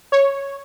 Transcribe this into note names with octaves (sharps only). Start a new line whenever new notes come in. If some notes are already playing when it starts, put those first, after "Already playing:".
C#5